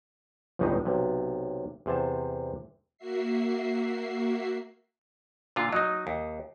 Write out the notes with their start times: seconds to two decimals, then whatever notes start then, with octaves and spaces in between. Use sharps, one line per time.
0.59 G1 C#2 A2 G3 G#3 D#4
0.85 B1 C3
1.86 E2 C3 C5 A5
2.98 A#3 F#4 E5 C7
5.56 A#2 D3 F4
5.73 F#3 D#4 D#5 D#6
6.07 D#2